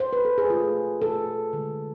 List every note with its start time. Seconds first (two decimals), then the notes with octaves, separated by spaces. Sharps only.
0.00 C5
0.13 B4
0.25 A4
0.38 G#4
0.50 B2 A3 F4
1.01 B2 A3 A4
1.53 D3 G#3